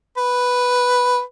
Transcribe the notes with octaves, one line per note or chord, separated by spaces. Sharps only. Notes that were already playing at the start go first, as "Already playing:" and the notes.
B4